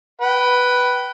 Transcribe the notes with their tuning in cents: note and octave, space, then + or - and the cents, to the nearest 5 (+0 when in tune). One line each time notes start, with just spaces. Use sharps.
B4 +0 G5 -30